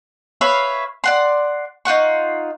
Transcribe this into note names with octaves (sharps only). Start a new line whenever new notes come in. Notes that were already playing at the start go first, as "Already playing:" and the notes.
B4 C#5 E5 F5
D5 F#5 C6
D#4 F4 F#5 C#6